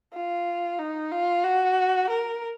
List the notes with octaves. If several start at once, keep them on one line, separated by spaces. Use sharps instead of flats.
F4
D#4
F4
F#4
A#4